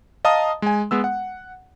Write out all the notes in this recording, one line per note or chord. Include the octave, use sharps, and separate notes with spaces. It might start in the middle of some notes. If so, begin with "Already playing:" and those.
D#5 F5 A5 A#5 D#6
G#3 G#5
G#3 B3 E6
F#5